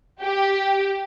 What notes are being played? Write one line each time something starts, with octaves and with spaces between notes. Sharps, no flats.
G4